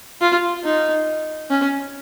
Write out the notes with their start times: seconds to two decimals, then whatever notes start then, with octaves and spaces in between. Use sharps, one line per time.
0.21 F4
0.64 D#4
1.50 C#4